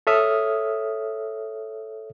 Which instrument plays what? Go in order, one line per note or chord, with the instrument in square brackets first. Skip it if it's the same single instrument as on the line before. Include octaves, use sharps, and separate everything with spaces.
[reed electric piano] A4 C#5 E5 D#6 F6